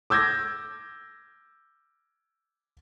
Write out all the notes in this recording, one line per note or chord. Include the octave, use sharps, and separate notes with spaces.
D6 E6 G6 G#6 A#6